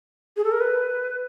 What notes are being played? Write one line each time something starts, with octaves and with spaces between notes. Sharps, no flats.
G#4
A4
A#4
B4